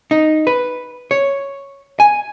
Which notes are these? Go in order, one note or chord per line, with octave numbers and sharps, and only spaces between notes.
D#4
B4
C#5
G#5